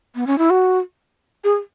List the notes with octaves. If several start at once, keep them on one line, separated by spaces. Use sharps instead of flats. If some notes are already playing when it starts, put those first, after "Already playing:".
B3
C#4
E4
F#4
G#4